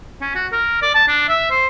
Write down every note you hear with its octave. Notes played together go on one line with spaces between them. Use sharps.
C#4
F#4
A#4
D5
A5
D4
E5
C5